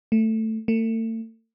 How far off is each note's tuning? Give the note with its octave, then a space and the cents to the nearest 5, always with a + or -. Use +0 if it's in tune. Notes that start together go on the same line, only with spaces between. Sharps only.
A3 +10
A3 +40